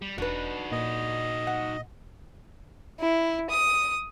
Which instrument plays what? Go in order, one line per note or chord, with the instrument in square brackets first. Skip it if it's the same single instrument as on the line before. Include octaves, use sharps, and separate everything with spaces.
[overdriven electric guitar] G3
[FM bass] E1 [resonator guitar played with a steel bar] D4 B4 [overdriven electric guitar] D#4 F#4
[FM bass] A#2 [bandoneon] D#5
[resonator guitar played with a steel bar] F#5
[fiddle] E4
D#6